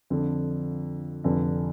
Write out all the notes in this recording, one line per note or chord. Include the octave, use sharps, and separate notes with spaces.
F2 D3 F3
F1 F2 D3